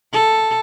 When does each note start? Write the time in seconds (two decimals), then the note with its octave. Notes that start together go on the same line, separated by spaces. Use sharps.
0.13 A4